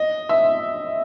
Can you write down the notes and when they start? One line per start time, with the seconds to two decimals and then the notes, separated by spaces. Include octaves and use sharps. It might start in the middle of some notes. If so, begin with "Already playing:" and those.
Already playing: D#5
0.29 E5